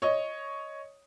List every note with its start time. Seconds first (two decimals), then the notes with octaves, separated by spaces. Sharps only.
0.02 C#5 D#5